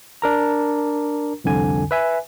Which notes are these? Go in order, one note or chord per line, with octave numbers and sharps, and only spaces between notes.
D4 A#4 A#5
C2 F2 D3 G#5
B4 E5 G#5